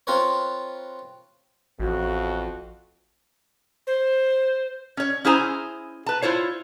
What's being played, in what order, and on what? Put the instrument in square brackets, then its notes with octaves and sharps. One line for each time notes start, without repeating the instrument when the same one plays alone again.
[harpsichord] C4 F4 A#4 B4 C#5
[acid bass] A1 [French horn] F2 [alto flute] F#4
[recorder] C5
[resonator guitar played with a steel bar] C#4 C#5
C#4 E4 G#4 C5 G#5 A#5
B4 A5
E4 F4 C5 C#5